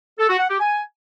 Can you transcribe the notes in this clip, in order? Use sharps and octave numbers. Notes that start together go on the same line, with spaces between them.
A4
F#4
F#5
G4
G#5